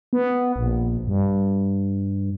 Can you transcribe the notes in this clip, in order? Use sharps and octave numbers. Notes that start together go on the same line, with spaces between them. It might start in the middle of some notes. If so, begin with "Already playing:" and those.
B3
A#1
G2